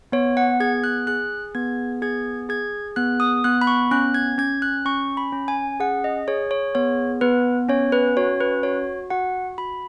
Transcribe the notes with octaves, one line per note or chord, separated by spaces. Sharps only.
B3 C#5
F#5
G#4 G#6
F#6
G#4 F#6
B3 G#6
G#4 G#6
G#4 G#6
B3 F#6
D#6
B3 F#6
B5
C#6
C#4 F#6
G#6
C#4 G#6
F#6
C#4 C#6
B5
C#4
G#5
G#4 F#5
D#5
G#4 C#5
C#5
B3 C#5
B3 B4
C#4 C#5
B4
F#4 C#5
B4
F#4 C#5
F#4 F#5
F#4 B5